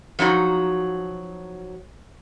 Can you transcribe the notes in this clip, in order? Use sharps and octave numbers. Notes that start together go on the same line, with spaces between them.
F3 F#3 D#4 F#4